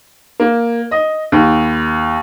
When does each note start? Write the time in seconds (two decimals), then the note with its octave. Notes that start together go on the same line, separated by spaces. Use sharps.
0.40 A#3
0.91 D#5
1.32 D#2